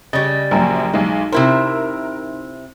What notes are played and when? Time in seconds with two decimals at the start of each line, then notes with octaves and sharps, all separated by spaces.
0.13 C#3 G3 D#5 A6
0.51 A#1 F#2 G5 A#5
0.94 B1 G#3 D#4
1.32 C3 E4 A#4 C5